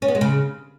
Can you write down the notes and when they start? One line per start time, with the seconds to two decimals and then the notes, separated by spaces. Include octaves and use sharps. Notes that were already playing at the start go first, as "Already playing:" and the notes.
0.02 C#4
0.08 B3
0.15 G#3
0.21 C#3